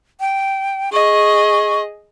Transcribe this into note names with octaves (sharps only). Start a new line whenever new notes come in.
G5
G#4 D#5 C#6